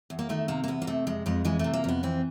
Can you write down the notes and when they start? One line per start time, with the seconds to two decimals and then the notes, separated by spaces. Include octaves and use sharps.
0.10 E2
0.19 A#3
0.29 D#3 A3
0.48 C3 A#3
0.64 A#3
0.68 E2 B3
0.82 A#3
0.87 C3 A3
1.07 F2 G#3
1.26 F2 G#3
1.45 E3 G#3
1.59 C3 A3
1.74 A#3
1.84 F2 B3
2.03 E3 C4